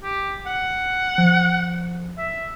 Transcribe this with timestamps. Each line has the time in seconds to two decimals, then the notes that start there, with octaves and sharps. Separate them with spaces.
0.03 G4
0.47 F#5
1.18 F3
2.18 E5